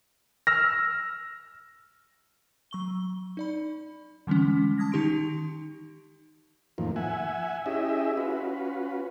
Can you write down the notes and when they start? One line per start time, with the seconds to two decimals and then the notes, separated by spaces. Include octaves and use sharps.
0.47 E6 F6 A#6
2.71 F#3 C#6 G7
3.37 D#4 D5 B5
4.27 D3 E3 G3 G#3 C#4
4.78 A5 D#6 G#6 A#6
4.92 D#3 D#4 G4 C6 D7
6.78 F2 A2 D#3 F3 A#3
6.96 E5 F#5 G#5
7.66 C#4 E4 G4 G#4 D#5 E5
8.17 C#4 F4 F#4 B4